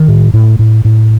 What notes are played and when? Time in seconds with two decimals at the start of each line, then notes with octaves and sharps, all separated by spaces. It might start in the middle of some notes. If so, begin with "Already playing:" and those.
Already playing: D#3
0.08 A2
0.34 A2
0.59 A2
0.85 A2